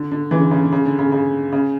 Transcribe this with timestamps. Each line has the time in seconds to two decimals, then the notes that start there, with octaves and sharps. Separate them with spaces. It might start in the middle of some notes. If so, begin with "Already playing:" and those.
Already playing: D3
0.12 D3
0.31 C#3 E3
0.42 D3
0.51 C#3
0.62 D3
0.72 C#3
0.86 D3
0.99 C#3
1.12 C#3
1.53 C#3